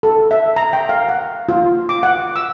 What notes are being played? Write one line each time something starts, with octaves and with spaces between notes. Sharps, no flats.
A4
E5
A#5
G5
F5
F#5
F4
D6
F#5
E6